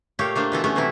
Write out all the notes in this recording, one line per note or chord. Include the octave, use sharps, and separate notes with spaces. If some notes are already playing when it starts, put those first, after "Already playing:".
A#2 A3 G4 C#5 F5
A3 A#3 D4 C5
B2 E3 A4 A#5
A3 B3 C#4 A4
A2 C3 E3 F#3 E4